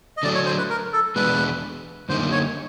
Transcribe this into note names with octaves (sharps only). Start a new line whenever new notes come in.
D#5
D3 F#3 A3 D4 D5
C#5
C5
B4
A#4
A4
E2 B2 G#3 B3 D4 B4
F#2 D3 G3 A#3 D#4 C5
C#5